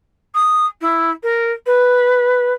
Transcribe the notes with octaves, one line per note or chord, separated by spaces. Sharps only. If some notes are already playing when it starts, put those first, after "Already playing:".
D#6
E4
A#4
B4